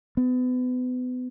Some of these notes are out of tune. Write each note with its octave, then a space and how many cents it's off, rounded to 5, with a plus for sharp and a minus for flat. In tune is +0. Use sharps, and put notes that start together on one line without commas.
B3 +30